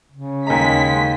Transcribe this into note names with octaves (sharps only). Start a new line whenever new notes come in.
C#3
D#2 G#3 A#5 B6